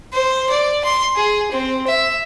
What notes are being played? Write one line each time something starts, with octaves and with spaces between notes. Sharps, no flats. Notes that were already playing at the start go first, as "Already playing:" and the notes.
C5
D5
C6
G#4
C4
E5